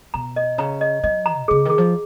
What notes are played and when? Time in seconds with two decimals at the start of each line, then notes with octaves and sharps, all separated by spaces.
0.14 B2 A#5
0.36 D#5
0.58 C#3 A#5
0.81 D#5
1.04 F#3 D#5
1.26 A#5
1.37 B2
1.48 C#3 G#4
1.65 D#3 G#4
1.78 F3